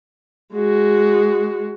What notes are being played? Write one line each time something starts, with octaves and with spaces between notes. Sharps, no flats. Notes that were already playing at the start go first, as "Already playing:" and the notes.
G#3 F#4